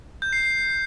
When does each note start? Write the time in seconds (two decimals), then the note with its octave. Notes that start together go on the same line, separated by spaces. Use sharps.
0.22 G6
0.33 C7
0.43 C7